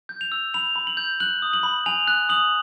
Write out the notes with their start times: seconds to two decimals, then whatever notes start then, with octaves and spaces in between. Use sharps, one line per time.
0.09 G6
0.21 F7
0.32 E6
0.54 B5 F7
0.76 B5
0.87 F#7
0.97 G6
1.20 F#6 F#7
1.42 D#6
1.53 F#7
1.63 B5
1.86 G#5 F7
2.08 F#6
2.29 D#6 F#7